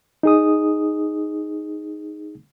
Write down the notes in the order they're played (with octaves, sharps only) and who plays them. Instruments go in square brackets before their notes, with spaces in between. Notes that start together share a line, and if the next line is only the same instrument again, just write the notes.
[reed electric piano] D#4 G#4 D#6